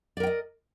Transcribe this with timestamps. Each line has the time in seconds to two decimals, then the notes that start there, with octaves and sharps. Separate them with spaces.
0.17 D5
0.20 A#4
0.23 G5
0.27 D#5